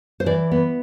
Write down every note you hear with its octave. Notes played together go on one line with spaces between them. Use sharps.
C5
E3 D5
B3